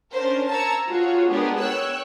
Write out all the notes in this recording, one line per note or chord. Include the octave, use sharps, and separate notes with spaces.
C#4 D4 A#4 C5
A5 A#5 E6 G#6 C#7
F4 F#4 G#4 C#5
G#3 B3 D4 G4 G#4 A#4
C#5 G5 E6 F#6